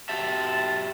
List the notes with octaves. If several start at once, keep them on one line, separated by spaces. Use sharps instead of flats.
F#4 G4 E5 A5